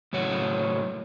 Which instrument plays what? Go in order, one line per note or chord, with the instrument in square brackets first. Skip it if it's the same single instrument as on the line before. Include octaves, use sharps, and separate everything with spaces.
[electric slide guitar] A2 C#3 F#3 C#5 F#5